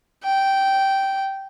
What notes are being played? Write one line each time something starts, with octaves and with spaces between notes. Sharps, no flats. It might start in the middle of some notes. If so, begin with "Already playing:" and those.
G5